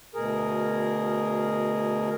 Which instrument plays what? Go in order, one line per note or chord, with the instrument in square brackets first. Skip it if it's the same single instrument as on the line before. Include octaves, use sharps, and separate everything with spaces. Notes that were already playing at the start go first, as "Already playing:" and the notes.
[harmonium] D2 B2 G#4 A#4